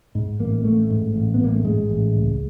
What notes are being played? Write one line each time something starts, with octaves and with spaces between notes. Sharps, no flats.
G#2
A1 A#3
A1 A3
G#2
A1
B3
A1 A#3
A3
G#2 G#3
A1
C#2